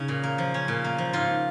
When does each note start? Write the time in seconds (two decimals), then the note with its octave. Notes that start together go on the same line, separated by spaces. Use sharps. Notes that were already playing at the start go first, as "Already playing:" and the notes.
Already playing: C#3 C#4 D#4
0.08 A#2
0.23 A#3
0.38 F3
0.54 C#4
0.68 A#2
0.84 A#3
0.98 F3
1.13 G#2 F4